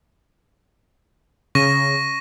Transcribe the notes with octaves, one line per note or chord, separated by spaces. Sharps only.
C#3 C#6 A#6 D#7